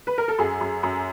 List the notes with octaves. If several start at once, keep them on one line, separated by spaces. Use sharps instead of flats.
B4
A#4
A4
F#2 G#4
F#2
F#2